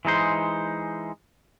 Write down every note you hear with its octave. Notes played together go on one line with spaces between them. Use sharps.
E3 G#3 D#4 C5